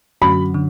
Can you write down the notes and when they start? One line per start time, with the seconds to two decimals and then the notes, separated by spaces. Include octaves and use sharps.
0.22 F#2 D3 F#3 C#4 F#4 B5
0.54 D3